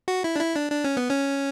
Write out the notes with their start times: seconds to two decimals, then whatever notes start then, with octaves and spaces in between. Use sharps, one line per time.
0.08 F#4
0.24 E4
0.36 D4
0.40 E4
0.56 D4
0.72 D4
0.84 C#4
0.97 B3
1.09 C#4